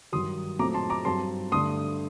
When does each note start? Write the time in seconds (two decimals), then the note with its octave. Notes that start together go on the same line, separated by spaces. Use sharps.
0.12 G2 D#3 F#3 C6 D#6
0.59 A#2 F#3 A3 C4 A#5 D6
0.74 A5 C6
0.90 A#5 D6
1.05 G2 F#3 C4 A5 C6
1.52 G2 D3 A3 D4 C6 D#6